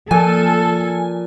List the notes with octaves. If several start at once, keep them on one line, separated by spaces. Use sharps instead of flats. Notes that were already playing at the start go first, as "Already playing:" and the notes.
A#2 F3 A4 G#5